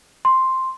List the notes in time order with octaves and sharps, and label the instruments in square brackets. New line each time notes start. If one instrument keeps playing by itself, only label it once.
[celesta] C6